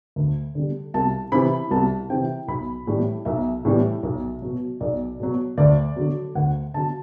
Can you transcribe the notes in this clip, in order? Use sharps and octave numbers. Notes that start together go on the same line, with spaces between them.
D2
D3 G3
C2 A5
C3 E3 B5
C2 A5
C3 E3 G5
B1 B5
A2 E3 G3
B1 E5
A2 E3 G3
B1
B2 F#3
B1 D5
B2 F#3
D2 D5
D3 F#3
D2 F#5
D3 F#3 A5